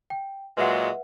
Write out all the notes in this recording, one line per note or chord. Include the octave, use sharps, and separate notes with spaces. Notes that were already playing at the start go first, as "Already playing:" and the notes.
G5
A#2 F#3 G#3 B4 E5 F#5